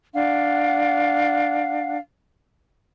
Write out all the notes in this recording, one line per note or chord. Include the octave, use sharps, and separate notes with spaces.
D4 F5 F#5